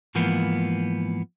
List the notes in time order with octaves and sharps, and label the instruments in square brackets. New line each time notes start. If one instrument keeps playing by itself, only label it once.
[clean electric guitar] G#2 E3 F3 A#3 B3